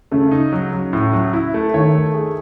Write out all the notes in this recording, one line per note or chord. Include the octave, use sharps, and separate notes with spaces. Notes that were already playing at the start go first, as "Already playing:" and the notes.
C#3 A3
D#4
F#3
F#3
A2
F#3
E4
A3
D#3 C#5
A3
G#4